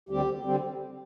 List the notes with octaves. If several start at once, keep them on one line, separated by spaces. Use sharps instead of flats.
D2 D3 G3 C4 G4
D3 G3 C4